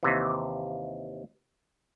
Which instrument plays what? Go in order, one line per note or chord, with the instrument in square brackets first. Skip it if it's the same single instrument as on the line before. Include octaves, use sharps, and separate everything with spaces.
[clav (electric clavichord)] D#2 C3 E3